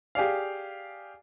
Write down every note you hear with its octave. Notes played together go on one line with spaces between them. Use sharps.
G4 G#4 D5 F5